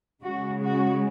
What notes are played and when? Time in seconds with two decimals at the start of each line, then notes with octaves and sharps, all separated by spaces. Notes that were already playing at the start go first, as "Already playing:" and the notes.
0.23 C#3 G#3 F#4
0.62 F#4